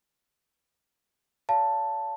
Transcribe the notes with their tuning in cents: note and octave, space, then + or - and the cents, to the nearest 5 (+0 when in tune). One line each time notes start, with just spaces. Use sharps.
C#5 +40 F5 -20 A5 +5